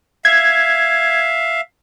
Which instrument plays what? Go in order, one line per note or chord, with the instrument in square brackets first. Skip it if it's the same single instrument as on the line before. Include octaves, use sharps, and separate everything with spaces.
[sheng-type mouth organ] E5 F5 [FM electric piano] G#6